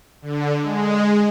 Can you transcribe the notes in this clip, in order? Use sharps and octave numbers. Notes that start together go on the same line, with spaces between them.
D3
G#3